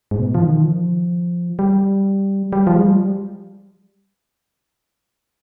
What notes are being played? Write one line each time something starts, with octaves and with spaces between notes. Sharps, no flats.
G#2
B2
F3
D#3
F3
G3
G3
F3
G#3
G3